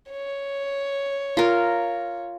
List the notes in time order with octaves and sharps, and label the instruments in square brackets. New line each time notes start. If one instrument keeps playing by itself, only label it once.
[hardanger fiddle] C#5
[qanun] F4 A#4